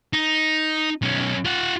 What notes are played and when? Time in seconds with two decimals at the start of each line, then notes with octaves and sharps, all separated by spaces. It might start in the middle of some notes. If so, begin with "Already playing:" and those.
0.13 D#4
1.02 B1 C#4
1.45 F4 F#5